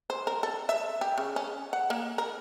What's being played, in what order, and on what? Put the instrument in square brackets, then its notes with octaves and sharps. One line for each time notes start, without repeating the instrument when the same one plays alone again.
[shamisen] C5
A#4
A4
E5
G4
C#3
C#4
F#5
A#3
A#4